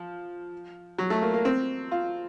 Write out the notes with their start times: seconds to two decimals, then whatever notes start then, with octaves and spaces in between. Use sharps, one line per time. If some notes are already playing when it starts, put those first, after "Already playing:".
Already playing: F3
0.98 F#3
1.10 A3
1.22 A#3
1.34 A#3
1.45 C4
1.92 F4